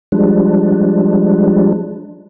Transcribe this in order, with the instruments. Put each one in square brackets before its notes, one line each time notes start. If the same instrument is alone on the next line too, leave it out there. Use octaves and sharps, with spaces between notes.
[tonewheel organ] F3 G3 G#3 D4